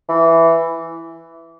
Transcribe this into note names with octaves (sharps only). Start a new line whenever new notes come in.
E3